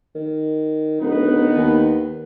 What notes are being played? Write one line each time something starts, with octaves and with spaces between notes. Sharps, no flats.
D#3
D1 B3 D#4 B4
D#2